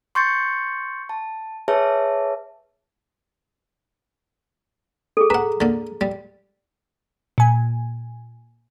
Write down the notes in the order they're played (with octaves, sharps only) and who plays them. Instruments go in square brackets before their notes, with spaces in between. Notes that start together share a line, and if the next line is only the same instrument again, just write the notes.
[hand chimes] C6 C#6 G6 A6 C#7
A5
G#4 B4 C#5 E5 A5
[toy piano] G#4 A4
[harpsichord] B4 F#5 [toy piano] A#5
[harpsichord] D3 A#3
G3
[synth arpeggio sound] A#2 G#5